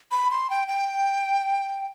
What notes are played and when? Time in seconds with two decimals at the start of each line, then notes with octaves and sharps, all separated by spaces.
0.11 B5
0.31 C6
0.50 G5
0.68 G5